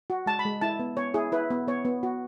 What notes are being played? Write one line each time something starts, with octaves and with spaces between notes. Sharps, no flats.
F#4
G#3 A5
B5
G#3
E4 A5
B3
B3 C#5
E4 G#4
E4 B4
B3
B3 C#5
B3
F#4